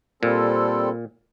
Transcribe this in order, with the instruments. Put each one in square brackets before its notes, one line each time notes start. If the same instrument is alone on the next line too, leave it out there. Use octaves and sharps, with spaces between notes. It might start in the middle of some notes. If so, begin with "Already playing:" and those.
[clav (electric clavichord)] A#2 [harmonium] G3 C4 A4